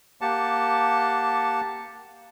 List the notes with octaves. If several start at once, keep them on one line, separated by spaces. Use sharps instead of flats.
A#3 G4 F#5 A5